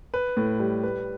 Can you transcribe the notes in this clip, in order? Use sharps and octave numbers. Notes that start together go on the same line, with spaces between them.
B4
A2
G3
B4